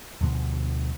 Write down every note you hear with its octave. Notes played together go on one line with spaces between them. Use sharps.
D2 B2 F3